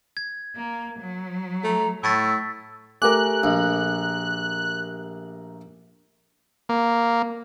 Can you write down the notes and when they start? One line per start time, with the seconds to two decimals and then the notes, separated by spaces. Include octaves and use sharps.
0.17 G#6
0.56 A#3
0.99 F#3
1.64 A3 A#5
2.03 A2 C#6 E6 A6 B6
3.02 A3 G4 A#4 G#5 D6 F#6
3.43 A#1
6.69 A#3